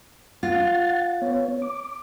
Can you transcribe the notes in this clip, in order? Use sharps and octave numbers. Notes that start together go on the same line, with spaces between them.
F4 F#5 A6
B3 C#5
D6